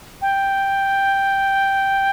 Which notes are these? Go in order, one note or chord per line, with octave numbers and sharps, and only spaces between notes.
G5